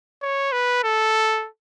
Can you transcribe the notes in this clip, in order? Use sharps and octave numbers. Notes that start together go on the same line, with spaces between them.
C#5
B4
A4